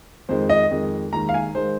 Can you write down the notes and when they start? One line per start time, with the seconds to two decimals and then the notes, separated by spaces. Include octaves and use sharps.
0.29 F2 D#3 G#3 C5
0.49 D#5
0.71 F2 D#3 G#3
1.13 D#2 D#3 G#3 A#5
1.29 F5
1.34 G#5
1.55 D#3 G#3 C5